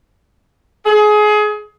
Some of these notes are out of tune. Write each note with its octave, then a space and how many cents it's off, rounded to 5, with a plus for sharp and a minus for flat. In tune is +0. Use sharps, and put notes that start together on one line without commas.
G#4 +25